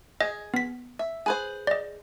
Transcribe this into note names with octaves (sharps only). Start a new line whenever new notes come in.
G#4 D#5
B3 B6
E5
G#4 B4 C5
D5 D#5